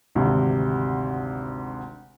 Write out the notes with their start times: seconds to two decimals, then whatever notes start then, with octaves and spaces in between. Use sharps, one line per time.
0.15 G#1 D2 C3